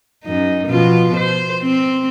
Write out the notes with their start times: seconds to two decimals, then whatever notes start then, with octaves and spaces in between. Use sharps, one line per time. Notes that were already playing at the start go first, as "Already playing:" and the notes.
0.24 F#2 D#4
0.67 B2 F3 F4
1.17 C5
1.63 C4